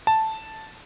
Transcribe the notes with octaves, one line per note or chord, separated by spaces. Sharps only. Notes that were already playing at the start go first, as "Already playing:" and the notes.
A5